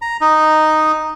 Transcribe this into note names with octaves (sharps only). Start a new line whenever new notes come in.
A#5
D#4